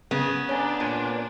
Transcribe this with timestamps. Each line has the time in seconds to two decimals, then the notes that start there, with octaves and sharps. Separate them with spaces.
0.11 C#3 B3
0.49 D4 C#5 G#5 A#5
0.80 A#2